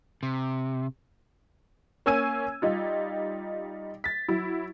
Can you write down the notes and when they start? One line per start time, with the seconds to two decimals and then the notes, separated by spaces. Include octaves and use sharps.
0.23 C3
2.06 A#3 C#4 G#5 E6 G#6 D#7
2.62 G3 D#4 F4
4.04 A6 B6
4.29 F#3 E4